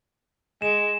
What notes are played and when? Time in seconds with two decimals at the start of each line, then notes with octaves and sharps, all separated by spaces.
0.62 G#3 E7